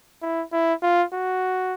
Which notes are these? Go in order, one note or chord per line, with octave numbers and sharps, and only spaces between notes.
E4
E4
F4
F#4